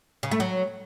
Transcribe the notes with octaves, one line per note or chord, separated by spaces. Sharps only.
C#3
A3
F#3